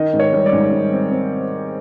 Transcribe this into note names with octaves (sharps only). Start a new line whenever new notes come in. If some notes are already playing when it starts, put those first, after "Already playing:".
Already playing: D#3 D#5
G#2
C#5
G3
D5
G#2
G3
C4
C4